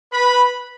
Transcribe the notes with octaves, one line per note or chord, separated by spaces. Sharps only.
B4 B5